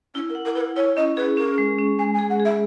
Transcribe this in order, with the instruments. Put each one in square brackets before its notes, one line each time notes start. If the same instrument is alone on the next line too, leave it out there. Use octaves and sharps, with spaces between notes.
[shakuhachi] C#4 [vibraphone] E4
[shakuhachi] A#4
[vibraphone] F#5
[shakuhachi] A#4
[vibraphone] E4 [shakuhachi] B4
[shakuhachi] A#4
[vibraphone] E4 [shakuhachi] C#5
[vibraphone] C#4 [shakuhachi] D#5
[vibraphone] G#4 [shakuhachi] B4
[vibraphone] C#4 [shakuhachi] A#4
[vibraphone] G#3
C#4
[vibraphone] G#3 [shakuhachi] G#5
[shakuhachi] G#5
[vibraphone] G#4
[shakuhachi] F#5
[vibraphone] G#4
[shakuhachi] E5